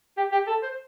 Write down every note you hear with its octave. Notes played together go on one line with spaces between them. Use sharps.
G4
G4
A4
C5